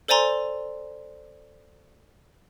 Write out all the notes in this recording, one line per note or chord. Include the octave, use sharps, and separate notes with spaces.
A4 C5 D5 G#5 A#5 C6